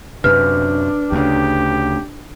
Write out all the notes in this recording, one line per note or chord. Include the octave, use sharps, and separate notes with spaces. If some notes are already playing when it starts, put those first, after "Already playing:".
F#2 C3 D4 B4 F6
D2 C#3 G4